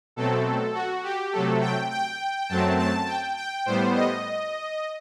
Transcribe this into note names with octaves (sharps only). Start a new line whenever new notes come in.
B2 F#3 A3 C4 A4
F#4
G4
C3 F#3 A3 A4
G5
G5
F#2 F#3 A3 C4 A5
A5
G5
G5
A2 G3 B3 C5
D#5